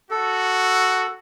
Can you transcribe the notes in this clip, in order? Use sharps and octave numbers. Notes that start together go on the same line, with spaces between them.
F#4 A4